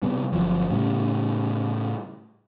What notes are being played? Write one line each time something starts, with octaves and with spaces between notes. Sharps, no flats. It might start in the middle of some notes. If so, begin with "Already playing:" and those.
C3 G3 B3
G1 F#2 F3 F#3
A2 C#3 G3